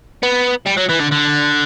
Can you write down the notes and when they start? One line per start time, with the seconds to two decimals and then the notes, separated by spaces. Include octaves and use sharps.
0.23 B3
0.67 G3
0.78 F#3
0.90 E3
1.00 D3
1.12 D3